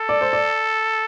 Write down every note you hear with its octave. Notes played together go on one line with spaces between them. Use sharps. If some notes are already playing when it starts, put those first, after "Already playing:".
Already playing: A4
D5
C5
D5